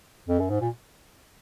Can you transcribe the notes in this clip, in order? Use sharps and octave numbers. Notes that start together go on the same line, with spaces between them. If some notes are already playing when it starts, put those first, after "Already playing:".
F2
F#2
G#2
A#2